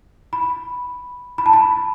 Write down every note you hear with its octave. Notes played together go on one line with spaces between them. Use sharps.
B5
B5
A5
B5